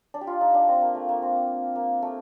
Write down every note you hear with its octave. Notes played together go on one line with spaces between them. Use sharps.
D4
G4
F4
D#4
D4
C4
A#3
A3
A#3
C4
A#3
A3